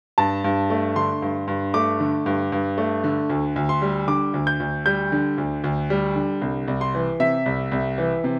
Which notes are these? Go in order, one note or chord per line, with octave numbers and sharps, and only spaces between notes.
G2 A5
G2
A3
D3 C6
G2
G2
A3 D6
D3
G2
G2
A3
D3
D2
D2
C6
G3
D3 D6
D2
G6
D2
G3 G6
D3
D2
D2
G3
D3
C2
C2
C6
E3
C3 E5
C2
C2
E3
C3